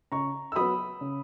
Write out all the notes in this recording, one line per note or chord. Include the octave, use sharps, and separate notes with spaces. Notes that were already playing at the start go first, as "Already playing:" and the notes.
C#3 A#5 C#6
E6
F#3 B3 B5 D#6
C#3